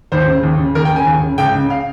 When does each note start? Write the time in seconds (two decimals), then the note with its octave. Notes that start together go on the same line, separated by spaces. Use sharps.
0.12 D#2 C5
0.27 C#3
0.43 D#2
0.59 C#3
0.75 D#2 A#4
0.85 G5
0.91 C#3
0.96 G#5
1.06 D#2
1.22 C#3
1.38 C#2 G5
1.54 C#3
1.70 F5